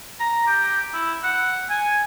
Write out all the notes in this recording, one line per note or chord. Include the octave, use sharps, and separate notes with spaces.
A#5
G4
E4
F#5
G#5